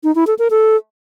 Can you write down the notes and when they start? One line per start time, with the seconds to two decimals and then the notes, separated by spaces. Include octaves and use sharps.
0.04 D#4
0.15 E4
0.27 A4
0.39 A#4
0.50 A4